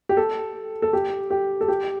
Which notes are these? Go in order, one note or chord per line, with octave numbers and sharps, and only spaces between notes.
G4
A4
A4
G4
G4
A4
G4